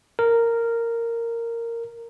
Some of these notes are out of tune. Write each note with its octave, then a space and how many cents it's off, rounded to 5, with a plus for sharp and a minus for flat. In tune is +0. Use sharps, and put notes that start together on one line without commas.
A#4 -10